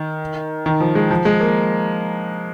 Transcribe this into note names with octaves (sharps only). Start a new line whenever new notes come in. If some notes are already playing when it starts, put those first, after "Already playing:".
Already playing: D#3
D#3
F3
G#3
F3
G#3
A#3